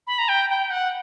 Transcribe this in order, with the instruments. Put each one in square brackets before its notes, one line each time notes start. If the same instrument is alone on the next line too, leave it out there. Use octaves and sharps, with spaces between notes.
[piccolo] B5
A#5
G5
G5
F#5